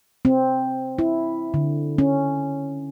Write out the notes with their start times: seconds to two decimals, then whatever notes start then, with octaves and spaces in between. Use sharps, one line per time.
0.25 C4
0.99 E4
1.54 D3
1.98 C#4